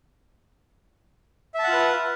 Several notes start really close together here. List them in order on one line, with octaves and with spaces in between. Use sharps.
E5 A5 F#5 F4 B4